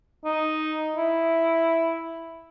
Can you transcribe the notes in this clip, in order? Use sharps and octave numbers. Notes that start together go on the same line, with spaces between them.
D#4
E4